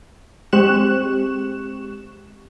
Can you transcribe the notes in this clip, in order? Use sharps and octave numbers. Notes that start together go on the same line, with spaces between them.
G#3 C4 G4 C#6 F#6 E7